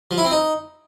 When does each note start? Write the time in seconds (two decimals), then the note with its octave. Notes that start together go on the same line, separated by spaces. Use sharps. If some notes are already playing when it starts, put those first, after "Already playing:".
0.11 F3
0.18 E4
0.24 C4
0.31 D#4